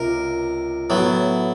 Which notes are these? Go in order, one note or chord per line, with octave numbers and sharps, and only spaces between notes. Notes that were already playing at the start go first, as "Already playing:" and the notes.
Already playing: C#2 C3 A#4
A2 F#3 B3